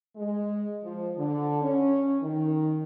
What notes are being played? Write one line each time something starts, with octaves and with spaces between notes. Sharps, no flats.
G#3
F3
D3
C#4
D#3